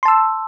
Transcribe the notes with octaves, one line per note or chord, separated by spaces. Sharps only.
A5 C6 E6